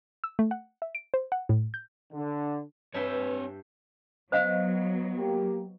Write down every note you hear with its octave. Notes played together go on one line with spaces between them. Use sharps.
E6
A3
F#5
E5
D7
C5
F#5
A2
G6
D3
G2 C4 B4 C#5 E5 G5
F#3 B3 C5 D#5 F5
A#3 G4